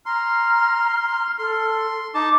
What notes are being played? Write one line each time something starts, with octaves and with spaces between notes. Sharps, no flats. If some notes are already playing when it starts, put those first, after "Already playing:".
A#5 C6 F6
A4 C6
D#4 A5 D6